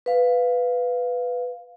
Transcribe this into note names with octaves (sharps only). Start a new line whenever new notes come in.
B4 F5